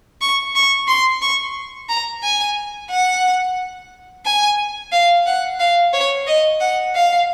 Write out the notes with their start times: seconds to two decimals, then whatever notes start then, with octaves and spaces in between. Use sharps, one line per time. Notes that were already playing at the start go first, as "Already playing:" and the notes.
0.21 C#6
0.55 C#6
0.88 C6
1.22 C#6
1.89 A#5
2.23 G#5
2.90 F#5
4.26 G#5
4.92 F5
5.26 F#5
5.60 F5
5.93 C#5
6.27 D#5
6.60 F#5
6.95 F5